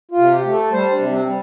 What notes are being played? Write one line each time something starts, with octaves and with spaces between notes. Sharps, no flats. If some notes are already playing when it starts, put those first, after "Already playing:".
F4
C3
G4
A3
A4
G3 C5
D4
C3
C4
G3